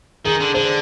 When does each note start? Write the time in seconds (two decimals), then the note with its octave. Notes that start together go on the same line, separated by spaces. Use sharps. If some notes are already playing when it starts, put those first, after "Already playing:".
0.25 D#3 G#4
0.40 D3
0.54 D3 C5